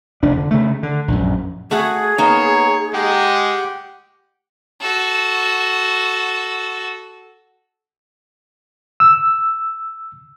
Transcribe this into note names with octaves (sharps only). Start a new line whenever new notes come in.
F1 D4
D3
C#3 A3
D3
A#1 F#2
A3 F#4 G#4 F#5
A#3 B3 D#4 C#5
G#3 G4 F#5 G5
F#4 A4
E6